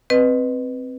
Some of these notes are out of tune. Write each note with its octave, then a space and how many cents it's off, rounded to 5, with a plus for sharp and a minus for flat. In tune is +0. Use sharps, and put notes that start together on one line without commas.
C4 +0 B4 +0 D#5 -20